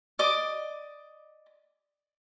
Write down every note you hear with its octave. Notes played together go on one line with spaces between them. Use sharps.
D5 D#5 D6